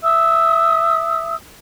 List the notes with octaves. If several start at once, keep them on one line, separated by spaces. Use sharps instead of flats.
E5 D#6 E6